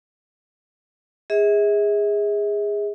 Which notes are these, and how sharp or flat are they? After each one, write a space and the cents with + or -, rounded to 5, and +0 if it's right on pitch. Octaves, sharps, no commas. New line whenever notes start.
G#4 -15 E5 -40